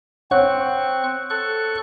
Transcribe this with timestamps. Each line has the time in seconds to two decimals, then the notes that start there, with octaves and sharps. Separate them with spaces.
0.31 C4 C#5 F#5 C#6 F#6
1.30 A4 C#6 F#6